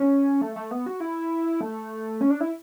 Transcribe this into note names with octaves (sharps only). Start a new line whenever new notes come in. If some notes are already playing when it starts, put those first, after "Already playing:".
Already playing: C#4
A3
A3
B3
F#4
E4
A3
C#4
D4
E4